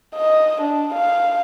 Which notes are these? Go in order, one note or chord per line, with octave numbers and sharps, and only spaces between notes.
D#5
D4
F5